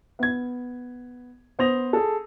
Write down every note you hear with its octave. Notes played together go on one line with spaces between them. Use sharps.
B3 G#6
B3 C5 D#6 A#6 F7
G#4 A4